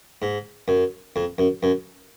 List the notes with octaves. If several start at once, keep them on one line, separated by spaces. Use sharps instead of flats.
G#2
F#2
F2
F#2
F#2